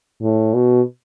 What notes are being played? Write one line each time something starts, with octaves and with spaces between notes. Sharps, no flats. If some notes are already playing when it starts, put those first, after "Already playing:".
A2
B2